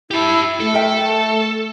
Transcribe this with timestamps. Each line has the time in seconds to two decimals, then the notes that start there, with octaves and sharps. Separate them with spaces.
0.11 E4 G4 A5
0.60 A3 A4
0.74 A#4 E5 G5